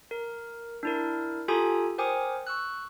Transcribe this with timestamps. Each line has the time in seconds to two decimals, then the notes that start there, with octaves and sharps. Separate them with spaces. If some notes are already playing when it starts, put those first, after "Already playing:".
0.11 A#4
0.83 D4 E4 A#4
1.48 F4 G4 A4 G#5 A#5 D#6
1.98 A#4 C5 G5 G#5 D6 D#6
2.47 C#6 E6 F#6